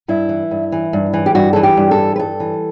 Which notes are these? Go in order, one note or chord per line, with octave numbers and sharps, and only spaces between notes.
G2 E4
E3
G2
E3
G2
E3
G4
G2 F#4
E3 A4
G4
G2
A4
E3
B4
G2 A4
E3